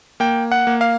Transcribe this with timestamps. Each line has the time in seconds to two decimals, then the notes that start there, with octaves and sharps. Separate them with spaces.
0.20 A#3 G5
0.52 F#5
0.67 A#3
0.81 F5